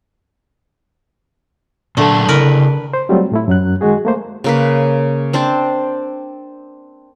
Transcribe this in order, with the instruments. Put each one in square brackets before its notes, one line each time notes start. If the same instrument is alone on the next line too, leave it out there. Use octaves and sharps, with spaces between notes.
[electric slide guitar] A#2 F#3 A5 [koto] D3 A3
[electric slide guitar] C#3 E4 [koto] A#4 B4
[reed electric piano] C5
F#3 G3 A3 C4 F4
A2 A3 E4
F#2 F#3 F#6
D#3 G#3 F#4 G#4
A3 A#3 C5
[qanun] C#3 A#3 B4
C4 D4 C5 A5